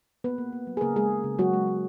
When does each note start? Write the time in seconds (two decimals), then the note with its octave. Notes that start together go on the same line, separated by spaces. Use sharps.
0.24 A#3 B3 B4
0.38 A#3
0.53 A#3
0.67 F#3
0.77 G#4
0.81 C#3 A#3 A#4
0.96 G#3 G#4
1.10 G#3
1.24 C#3
1.39 F#3 G#3 F#4
1.53 G#3
1.68 G#3